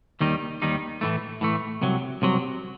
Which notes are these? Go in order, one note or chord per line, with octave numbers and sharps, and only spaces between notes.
D#2 D#3 G3 D#4
D#2 D#3 G3 D#4
A2 E3 A3
A2 E3 A3
C2 C3 F#3
C2 C3 F#3